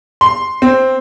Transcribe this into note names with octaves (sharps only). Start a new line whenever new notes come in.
C6
C4